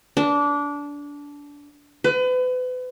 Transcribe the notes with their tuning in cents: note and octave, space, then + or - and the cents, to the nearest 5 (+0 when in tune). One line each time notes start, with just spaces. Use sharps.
D4 -20
B4 +35